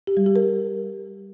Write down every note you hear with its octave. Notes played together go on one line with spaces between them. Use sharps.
G4
G3
G4
A#4